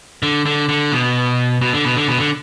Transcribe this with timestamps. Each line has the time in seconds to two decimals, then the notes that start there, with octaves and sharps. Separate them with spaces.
0.23 D3
0.46 D3
0.69 D3
0.92 B2
1.61 B2
1.73 D3
1.85 B2
1.97 D3
2.08 B2
2.18 D3